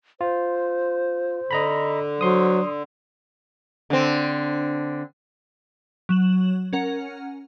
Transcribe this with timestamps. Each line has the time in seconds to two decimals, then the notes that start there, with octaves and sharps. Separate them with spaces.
0.21 F4 C5
1.51 D3 D#5 A#5 B5
2.21 F#3 C5 C6 D#6
3.90 D3 C4
6.09 F#3 E7 F#7
6.73 C#4 A#4 F#5